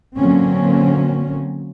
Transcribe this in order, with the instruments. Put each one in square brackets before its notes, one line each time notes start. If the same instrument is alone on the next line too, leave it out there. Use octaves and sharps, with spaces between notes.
[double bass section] D3 F#3 A#3 C4 C#4